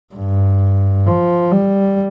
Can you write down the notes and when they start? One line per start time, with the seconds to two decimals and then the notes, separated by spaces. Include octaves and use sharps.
0.14 G2
1.06 F3
1.51 G3